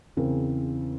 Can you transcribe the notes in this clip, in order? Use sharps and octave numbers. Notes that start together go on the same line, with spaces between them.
E2 C#3 C4 A#4